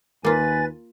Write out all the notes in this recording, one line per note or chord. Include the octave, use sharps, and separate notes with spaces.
D#2 A#3 F4 B4 G#5 A6